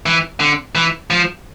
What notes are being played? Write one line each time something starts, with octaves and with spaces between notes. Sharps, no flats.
E3
D3
E3
F3